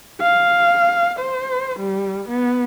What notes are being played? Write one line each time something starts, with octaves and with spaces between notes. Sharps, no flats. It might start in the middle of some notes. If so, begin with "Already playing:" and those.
F5
C5
G3
B3